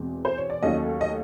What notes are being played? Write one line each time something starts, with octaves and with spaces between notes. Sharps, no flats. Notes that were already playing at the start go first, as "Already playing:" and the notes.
Already playing: E2 B2 G#3 C4
C5
C#5
D5
D#2 D#3 F#3 A3 C#4 D#5
D#5